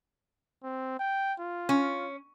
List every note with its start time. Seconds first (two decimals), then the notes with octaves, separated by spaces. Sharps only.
0.64 C4
0.99 G5
1.40 F4
1.69 C#4